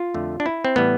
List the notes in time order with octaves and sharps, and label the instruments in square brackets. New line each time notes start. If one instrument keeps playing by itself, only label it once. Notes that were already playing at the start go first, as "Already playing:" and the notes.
Already playing: [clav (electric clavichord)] F4
F2 D3 A3
D4
E4
C4
A2 E3 G3 B3